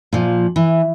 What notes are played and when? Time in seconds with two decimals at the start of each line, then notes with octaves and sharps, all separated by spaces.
0.13 A#2 F3
0.56 E3